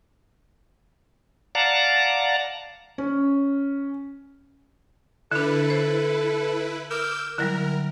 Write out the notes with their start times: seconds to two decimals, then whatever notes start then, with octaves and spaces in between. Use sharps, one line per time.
1.55 D5 F5 F#5 A5 A#5
2.98 C#4
5.32 D3 D4 E4 A4 B4
5.70 C5
6.90 A#4 D6 E6 G6
7.38 D3 F#3 G3 E4 A#4